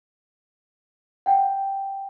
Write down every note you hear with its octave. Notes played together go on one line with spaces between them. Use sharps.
F#5 G5